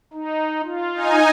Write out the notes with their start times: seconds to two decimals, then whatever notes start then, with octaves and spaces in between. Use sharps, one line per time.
0.14 D#4
0.64 F4
0.94 D#4 G#5